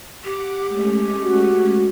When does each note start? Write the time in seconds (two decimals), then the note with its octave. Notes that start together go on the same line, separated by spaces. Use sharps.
0.24 G4 F#5 D6
0.69 G#3 A3 C#4
1.23 F#4